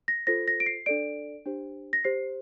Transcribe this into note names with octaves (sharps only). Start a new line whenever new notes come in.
A#6
F4 A4 C5 A#6
A#6
D7
C7
D4 A4 D5 D7
D4 G4 C5
A#6
G4 C5 C7